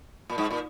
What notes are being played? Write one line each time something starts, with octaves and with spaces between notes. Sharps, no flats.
A#2
G#2
A#2